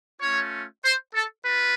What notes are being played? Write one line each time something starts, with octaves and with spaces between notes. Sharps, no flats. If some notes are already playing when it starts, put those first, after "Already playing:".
A3 C#4 F4 C#5
C5
A4
F4 B4